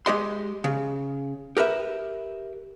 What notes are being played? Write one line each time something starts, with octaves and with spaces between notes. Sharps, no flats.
G#3 G4 D#5 C6
C#3
G4 A#4 B4 E5